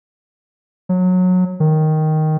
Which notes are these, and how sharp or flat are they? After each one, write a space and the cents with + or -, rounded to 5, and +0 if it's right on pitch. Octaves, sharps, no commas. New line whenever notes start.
F#3 -20
D#3 +0